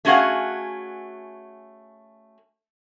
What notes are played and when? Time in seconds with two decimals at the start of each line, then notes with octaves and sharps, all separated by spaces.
0.05 A3 C#4 F#4 G#4 F5 F#5